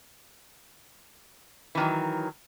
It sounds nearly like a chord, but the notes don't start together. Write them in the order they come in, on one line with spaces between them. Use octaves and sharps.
E3 D#3 F#3